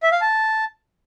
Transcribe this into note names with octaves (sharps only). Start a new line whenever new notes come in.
E5
F5
A5